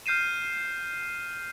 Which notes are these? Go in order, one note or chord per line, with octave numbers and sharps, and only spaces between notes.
F6 G6 C7 D#7 E7